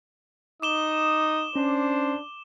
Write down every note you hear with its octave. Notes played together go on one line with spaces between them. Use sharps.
D#4 D6 D#6 E7 G7
C#4 D4 C5